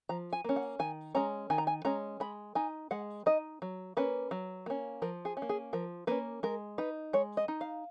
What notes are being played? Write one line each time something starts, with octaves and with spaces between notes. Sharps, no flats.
F3 A#5
G#5
A#3 C#4
F#5
D#3 G#5
G#3 C#4 A#5
D#3 G#5
A#5
G#5
G#3 C#4 A#5
G#3 B5
D#4 G#5
G#3 F#5
D#4 D#5
F#3
A#3 C#4 B4
F#3
A#3 C#4
F3 A#4
G#4
C#4
A#3
G#4
F3 A#4
A#3 C#4 B4
G#3 A#4
D#4 B4
G#3 C#5
D#5
D#4
F5